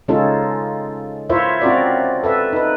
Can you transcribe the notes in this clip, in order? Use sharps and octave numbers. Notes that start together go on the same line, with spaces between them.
C#3 G#3 C#4 D#4 F4 A4
E4 F4 A#4 C5 C#5 E5
C4 C#4 F4 F#4 A#4 D5
A4 B4 E5
D#4 B4